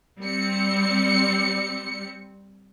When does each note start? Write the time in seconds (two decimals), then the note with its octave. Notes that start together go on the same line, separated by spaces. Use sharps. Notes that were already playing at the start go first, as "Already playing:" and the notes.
0.20 G3 C4 C#7